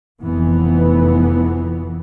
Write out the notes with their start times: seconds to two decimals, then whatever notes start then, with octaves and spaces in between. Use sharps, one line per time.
0.21 F1 F2 E3 B3